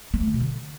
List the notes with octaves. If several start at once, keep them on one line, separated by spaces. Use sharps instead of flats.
B3
A3
D3
B2
D3